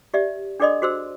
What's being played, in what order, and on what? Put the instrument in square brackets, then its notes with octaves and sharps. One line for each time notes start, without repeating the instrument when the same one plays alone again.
[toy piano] G4 D5 E5
D4 G#4 A4 D5 D#5 C6
F#4 G#4 C5 C6 E6